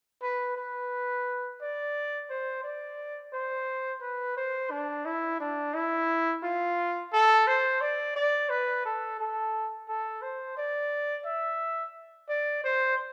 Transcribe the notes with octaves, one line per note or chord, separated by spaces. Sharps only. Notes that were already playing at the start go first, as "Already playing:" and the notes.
B4
B4
D5
C5
D5
C5
B4
C5
D4
E4
D4
E4
F4
A4
C5
D5
D5
B4
A4
A4
A4
C5
D5
E5
D5
C5